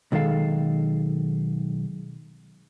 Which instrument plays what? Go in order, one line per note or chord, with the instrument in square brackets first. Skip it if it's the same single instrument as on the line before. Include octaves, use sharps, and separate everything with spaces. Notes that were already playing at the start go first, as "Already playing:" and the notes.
[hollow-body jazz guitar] B1 D#3 G#3 A4 F5